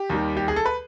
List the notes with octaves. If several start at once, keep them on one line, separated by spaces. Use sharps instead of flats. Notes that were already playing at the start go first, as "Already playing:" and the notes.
Already playing: G4
D#2 D#3 G3
G4
G#4
A4
B4